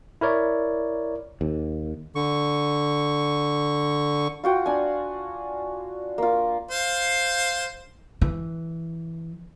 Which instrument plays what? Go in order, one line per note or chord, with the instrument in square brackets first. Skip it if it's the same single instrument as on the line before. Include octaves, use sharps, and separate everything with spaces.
[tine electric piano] E4 A#4 C#5 D5
[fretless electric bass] D#2
[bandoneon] D3 C#6
[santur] F4 F#4 G5
D4 G#5
A#3 F4
[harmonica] C5 F5
[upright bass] E3